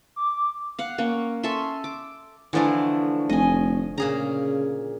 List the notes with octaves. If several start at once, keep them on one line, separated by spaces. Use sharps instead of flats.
D6
F5 F#5
A#3 C#4
C#4 A4 E5 C6
D6
D3 E3 F3 A3 D4
F1 D#5 G#5
A#2 C#3 G#4 A#5